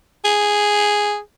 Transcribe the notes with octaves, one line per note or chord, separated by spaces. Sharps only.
G#4